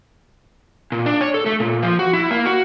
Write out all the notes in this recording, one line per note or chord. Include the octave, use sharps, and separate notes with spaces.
A#2
D4
C#5
A4
A3
A#2
F3
F#4
E4
A#3
F#4